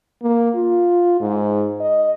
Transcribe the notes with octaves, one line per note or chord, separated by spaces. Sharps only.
A#3
F4
G#2
D#5